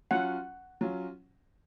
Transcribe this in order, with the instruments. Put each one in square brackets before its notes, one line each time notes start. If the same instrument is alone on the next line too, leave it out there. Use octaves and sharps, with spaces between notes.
[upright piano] F#3 C#4 F4 [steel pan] F#5
[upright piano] F#3 C#4 F4